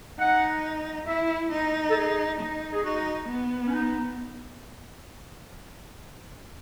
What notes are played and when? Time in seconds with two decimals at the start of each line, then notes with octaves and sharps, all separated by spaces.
0.19 D#4 F#5
1.07 E4 E5
1.52 D#4
1.90 A4
1.95 G#4
2.40 D#4
2.73 G#4
2.84 D#4 F#4
3.28 B3
3.67 C#4
3.73 D#4